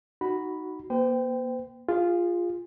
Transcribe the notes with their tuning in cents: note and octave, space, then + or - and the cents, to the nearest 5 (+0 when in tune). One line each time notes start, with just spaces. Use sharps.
D#4 +0 F#4 +5 B5 +0
A#3 +35 C5 -40 G5 +0
F4 +0 G#4 -30